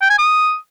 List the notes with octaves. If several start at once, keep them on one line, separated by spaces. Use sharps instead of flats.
G5
G#5
D#6